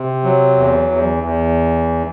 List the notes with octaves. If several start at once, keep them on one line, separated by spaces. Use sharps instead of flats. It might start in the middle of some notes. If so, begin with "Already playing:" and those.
Already playing: C3
F#3
E2
E2
E2